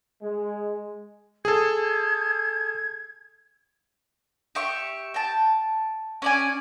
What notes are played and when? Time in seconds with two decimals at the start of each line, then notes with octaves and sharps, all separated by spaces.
0.22 G#3
1.45 G#4 A4 G#6
4.55 G4 E5 C#6
5.14 G5 A5
6.22 C#4 D5 G#5